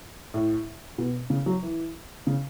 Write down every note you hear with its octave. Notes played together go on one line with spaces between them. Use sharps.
A2
B2
C#3
F#3
E3
C#3